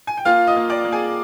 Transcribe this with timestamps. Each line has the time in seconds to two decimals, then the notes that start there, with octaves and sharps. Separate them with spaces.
0.07 G#5
0.17 G5
0.25 A#3 F4 F5
0.47 D#5 D#6
0.56 A#3
0.70 D5 D6
0.85 A#3
0.92 G#4 G#5